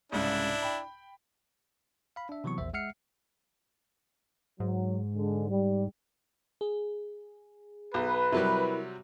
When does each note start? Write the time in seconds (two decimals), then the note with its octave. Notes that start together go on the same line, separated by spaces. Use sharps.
0.12 C2 G#2 C#3 D4 E4
0.62 G5 B5
2.16 F5 B5
2.29 D4 E5
2.44 C3 E3 F#3 B3 C#6
2.58 A#1 E2 C5 E5
2.73 G#3 E5 F#5 F6 C7 C#7
4.60 G#2 F#3
5.15 D3 G#3
5.50 G3
6.61 G#4
7.94 B1 B4
8.32 C3 F#3 G3 E4 A#4